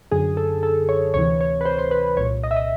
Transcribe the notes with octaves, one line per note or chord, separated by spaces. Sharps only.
F#2 D3 G#4
A4
A4
C#5
D2 C3 E3 C#5
C#5
B4
C5
C5
B4
C2 A#2 C#5
D#5
E5
D#5